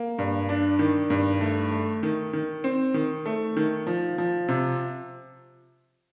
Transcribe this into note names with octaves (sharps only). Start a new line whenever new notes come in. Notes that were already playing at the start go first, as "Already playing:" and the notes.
Already playing: A#3
G2
D4
D#3
G2
A3
A3
D#3
D#3
C4
D#3
A3
D#3
F3
F3
C3